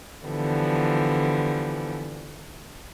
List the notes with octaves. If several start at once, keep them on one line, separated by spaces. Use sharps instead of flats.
D3 E3 F3 G3 B3